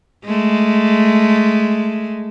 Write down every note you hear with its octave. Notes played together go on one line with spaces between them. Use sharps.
G#3 A3